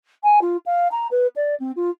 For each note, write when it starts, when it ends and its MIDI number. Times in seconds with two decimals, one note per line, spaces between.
0.23 0.39 80
0.41 0.57 65
0.66 0.88 77
0.91 1.07 82
1.11 1.27 71
1.35 1.54 74
1.59 1.71 60
1.76 1.90 65